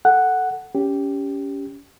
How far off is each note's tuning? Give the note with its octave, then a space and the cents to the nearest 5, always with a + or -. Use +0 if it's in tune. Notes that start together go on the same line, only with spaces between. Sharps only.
A4 +0 F#5 +0
C#4 +20 G4 +0